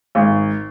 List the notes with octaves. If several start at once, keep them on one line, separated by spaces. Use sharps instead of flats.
G#1